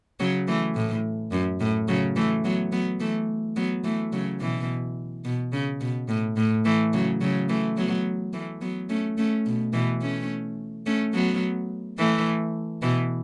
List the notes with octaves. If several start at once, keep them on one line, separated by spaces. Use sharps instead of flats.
C#3 F#3
E3 A3
A2
F#2
A2
C#3 F#3
E3 A3
F#3 B3
F#3 B3
E3 A3
F#3 B3
E3 A3
C#3 F#3
B2 E3
B2
C#3
B2
A2
A2
E3 A3
C#3 F#3
C#3 F#3
E3 A3
F#3 B3
E3 A3
F#3 B3
A3 C#4
A3 C#4
B2
B2 E3
A3 C#4
A3 C#4
F#3 B3
E3 A3
B2 E3